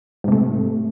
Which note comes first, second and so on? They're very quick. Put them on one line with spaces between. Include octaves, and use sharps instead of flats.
G#2 C3 A3